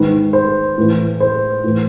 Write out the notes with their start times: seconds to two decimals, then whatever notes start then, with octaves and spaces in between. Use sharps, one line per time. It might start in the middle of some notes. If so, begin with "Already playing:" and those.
Already playing: G#2 D#3 B4
0.33 C5
0.78 A2 E3
1.20 C5
1.64 A2 E3